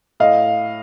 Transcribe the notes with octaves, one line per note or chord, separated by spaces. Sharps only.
A2 D#5 F5